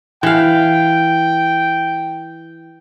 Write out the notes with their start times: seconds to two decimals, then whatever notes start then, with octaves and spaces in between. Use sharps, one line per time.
0.23 E3 F5 G5